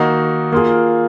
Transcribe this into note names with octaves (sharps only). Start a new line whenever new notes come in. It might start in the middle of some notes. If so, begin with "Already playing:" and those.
Already playing: D#3 A#3 D#4 F#4
A#3 F4 G#4